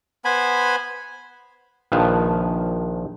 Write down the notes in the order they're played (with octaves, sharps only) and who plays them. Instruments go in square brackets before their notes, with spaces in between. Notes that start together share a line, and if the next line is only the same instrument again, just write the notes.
[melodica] B3 C5 G#5 B5
[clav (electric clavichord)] A#1 D#3 F3 B4 F5 A5